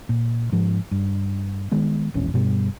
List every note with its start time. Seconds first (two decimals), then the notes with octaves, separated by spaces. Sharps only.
0.09 A#2
0.52 G#2 F3
0.91 G2
1.72 D#3 G#3 B3
2.14 E1 A#1 E2 C#4
2.34 G2 B2 G3